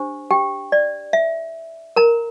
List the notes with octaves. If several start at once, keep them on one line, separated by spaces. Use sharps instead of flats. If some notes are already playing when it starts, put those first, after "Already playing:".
Already playing: D4 G4 C5
G4 G5
D5
E5
A#4 A#5